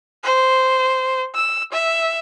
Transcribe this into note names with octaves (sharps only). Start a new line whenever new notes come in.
C5
E6
E5